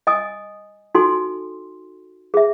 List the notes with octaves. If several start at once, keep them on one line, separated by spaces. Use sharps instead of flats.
D#5 G#5 D#6
D#4 F#4 A4 G#5 C6
G#4 E5